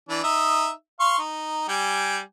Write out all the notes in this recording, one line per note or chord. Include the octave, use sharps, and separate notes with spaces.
E3 D4
D#4 E5 D#6
F5 C6 C#6
D#4
G3 G5 G#5